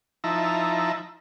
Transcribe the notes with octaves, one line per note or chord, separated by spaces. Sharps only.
F3 D#4 E4 E5 A5 A#5